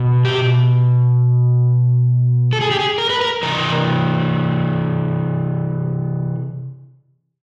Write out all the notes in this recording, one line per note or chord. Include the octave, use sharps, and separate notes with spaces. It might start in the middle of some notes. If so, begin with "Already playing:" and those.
Already playing: B2
G4
A4
G#4
G4
G#4
A#4
B4
A#4
C3 E3 A#4